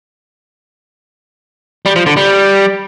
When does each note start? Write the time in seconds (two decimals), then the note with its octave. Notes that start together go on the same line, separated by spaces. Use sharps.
1.86 G3
1.96 F3
2.06 D3
2.17 G3